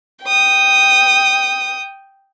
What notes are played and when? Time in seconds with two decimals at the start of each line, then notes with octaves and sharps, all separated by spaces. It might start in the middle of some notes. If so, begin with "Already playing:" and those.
0.24 G5 D#6